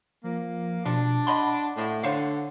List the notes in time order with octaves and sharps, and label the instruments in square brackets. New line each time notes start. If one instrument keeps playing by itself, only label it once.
[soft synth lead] F3 [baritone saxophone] A#3
[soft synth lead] B2 [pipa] F3 G3 [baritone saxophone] D4
[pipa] D#5 B5 C6 [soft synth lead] F#5
[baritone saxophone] A2
[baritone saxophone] D3 [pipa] C5 C#5 F5